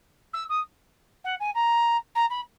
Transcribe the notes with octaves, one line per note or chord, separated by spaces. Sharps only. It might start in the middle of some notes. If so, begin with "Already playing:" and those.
E6
D#6
F#5
G#5
A#5
A#5
B5